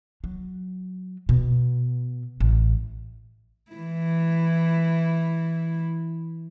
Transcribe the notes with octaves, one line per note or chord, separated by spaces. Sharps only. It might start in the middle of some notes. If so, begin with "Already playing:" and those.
F#3
B2
A1
E3 E4